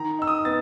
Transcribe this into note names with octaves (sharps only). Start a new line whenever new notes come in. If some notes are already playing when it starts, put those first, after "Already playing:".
Already playing: D#3 A#5
D#4 E6
D#6
B3 A6